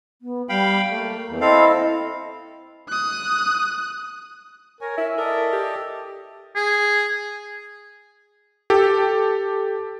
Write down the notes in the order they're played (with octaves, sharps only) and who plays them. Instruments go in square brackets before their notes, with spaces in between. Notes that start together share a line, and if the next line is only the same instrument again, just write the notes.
[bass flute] B3
[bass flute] G3 [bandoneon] F5 G5 B5
[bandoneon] A3 [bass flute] A#3
[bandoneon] E2
[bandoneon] C4 A4 F5 [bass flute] E4 [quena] D#5
[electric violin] D#6 F#6
[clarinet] A#4 [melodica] C#5 G#5
[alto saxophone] E4 [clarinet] E5
[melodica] A4 D5 D#5 [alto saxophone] A#4
[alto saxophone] G4
[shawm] G#4
[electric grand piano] G4 A4